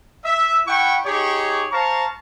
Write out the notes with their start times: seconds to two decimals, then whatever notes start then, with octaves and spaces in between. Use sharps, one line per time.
0.25 E5
0.66 E4 F#5 G5 B5 C#6
1.05 D#4 G4 G#4 C#5
1.71 C5 F5 A5 A#5 C#6